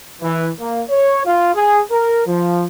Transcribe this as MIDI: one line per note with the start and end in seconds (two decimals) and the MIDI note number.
0.22 0.49 52
0.59 0.82 58
0.90 1.24 73
1.26 1.53 65
1.55 1.81 68
1.91 2.22 70
2.27 2.65 53